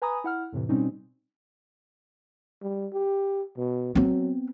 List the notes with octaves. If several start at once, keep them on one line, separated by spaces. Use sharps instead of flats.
B4 G#5 A#5 B5 D#6
E4 F#5 F6
F2 A2 C3 E3
B2 G3 C4 C#4 D#4
G3
G4
B2
F#3 B3 C4